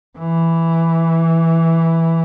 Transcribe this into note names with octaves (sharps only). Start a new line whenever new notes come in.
E3